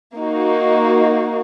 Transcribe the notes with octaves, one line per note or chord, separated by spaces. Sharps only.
A#3 D#4 F#4